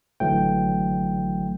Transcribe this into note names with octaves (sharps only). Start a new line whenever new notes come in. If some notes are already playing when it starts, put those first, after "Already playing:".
A1 D3 E3 F#3 A3 G5